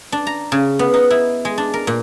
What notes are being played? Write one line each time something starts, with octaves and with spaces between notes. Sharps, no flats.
D4
A#5
C#3
B3
D#4
E4
G#3
D4
A#4
A#2